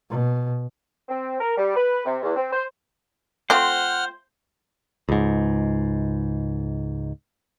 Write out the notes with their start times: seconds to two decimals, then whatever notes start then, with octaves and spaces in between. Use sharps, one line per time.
0.10 B2
1.09 C4
1.40 A#4
1.57 G3
1.76 B4
2.05 C3
2.23 E2
2.36 C4
2.53 C5
3.50 A3 C4 F4 C5 F#5 F6
5.09 C#2 G#2